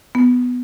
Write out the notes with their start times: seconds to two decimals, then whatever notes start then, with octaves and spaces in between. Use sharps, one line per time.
0.15 B3